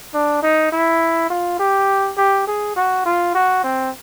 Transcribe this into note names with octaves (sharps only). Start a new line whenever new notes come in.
D4
D#4
E4
F4
G4
G4
G#4
F#4
F4
F#4
C4